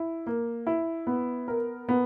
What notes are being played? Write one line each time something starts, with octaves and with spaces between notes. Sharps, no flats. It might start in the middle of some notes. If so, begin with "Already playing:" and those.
Already playing: E4
A#3
E4
B3
A#4
B3